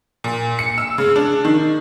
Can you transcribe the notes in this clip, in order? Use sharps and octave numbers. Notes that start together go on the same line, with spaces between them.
A#2
C#7
E6
C#3
D4
D#3